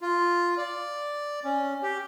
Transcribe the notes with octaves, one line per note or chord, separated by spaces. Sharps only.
F4
D5
C#4
G4